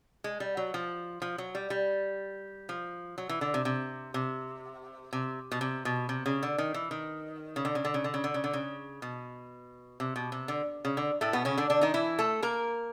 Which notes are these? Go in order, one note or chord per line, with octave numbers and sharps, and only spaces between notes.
G#3
G3
F#3
F3
F3
F#3
G3
G3
F3
F#3
E3
D3
C3
C3
C3
C3
B2
C3
B2
C3
C#3
D3
D#3
E3
D#3
C#3
D3
C#3
D3
C#3
D3
C#3
D3
C#3
D3
C#3
B2
C3
B2
C3
D3
C#3
D3
A2 A3
B2 B3
C#3 C#4
D3 D4
D3 D4
D#3 D#4
E3 E4
A3 A4
A#3 A#4